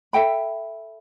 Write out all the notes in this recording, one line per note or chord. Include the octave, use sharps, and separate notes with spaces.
A4 E5 G5 B5